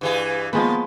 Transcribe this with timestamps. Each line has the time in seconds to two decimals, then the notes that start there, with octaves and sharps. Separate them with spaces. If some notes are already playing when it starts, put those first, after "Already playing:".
0.01 G2 E3 G#4
0.53 D#3 F3 G#3 A#3 B3 B4